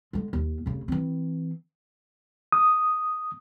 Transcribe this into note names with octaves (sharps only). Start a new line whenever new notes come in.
D3 G#3
D#2
F1 C#3
E3 C4
D#6